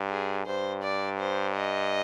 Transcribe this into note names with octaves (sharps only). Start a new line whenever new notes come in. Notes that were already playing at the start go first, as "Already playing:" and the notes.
Already playing: G2
G#4
G2 C5
D5
C5
D#5